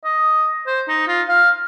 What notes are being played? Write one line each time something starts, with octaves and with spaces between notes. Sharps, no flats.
D#5
C5
D#4
F4
F5